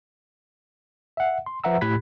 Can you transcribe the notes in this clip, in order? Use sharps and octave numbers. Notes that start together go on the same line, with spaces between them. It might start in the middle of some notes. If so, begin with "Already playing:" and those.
E5 F#5
C6
F3 B4 E5 F#5 A#5 E6
A2 G4 B5 F#6 G#6 B6